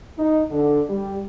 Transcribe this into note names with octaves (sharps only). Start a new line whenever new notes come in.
D#4
D3
G3